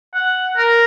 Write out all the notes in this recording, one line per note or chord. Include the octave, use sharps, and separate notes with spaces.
F#5
A#4